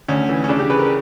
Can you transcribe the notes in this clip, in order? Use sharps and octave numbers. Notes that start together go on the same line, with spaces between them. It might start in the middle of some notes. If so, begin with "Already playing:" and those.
D2 C#4
E3
C#4
C#3 D4
G4
C#3 B4
A#4